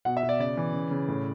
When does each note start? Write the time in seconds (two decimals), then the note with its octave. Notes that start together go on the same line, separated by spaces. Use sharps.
0.05 B2 F#5
0.17 E5
0.23 B2
0.29 D5
0.39 C#3 D5
0.57 E3
0.74 C#3
0.91 C#3
1.08 A2